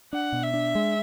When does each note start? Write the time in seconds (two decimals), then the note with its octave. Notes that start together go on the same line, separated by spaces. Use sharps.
0.13 D4 F#5
0.33 B2
0.43 E5
0.54 D4
0.75 G#3